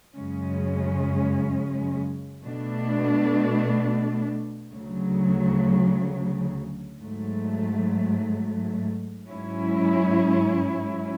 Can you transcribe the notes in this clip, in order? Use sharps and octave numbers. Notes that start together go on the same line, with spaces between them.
F#2 C#3 G#3 C#4
B2 A3 D4
D2 C#3 F#3
G#2 F#3 A3
G#2 F#3 C#4 E4